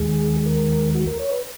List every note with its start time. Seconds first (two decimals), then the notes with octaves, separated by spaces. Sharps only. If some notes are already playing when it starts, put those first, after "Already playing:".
Already playing: D#2 D#3 G#3 G#4
0.46 A#4
0.95 F#4
1.07 A#4
1.19 C#5
1.31 B4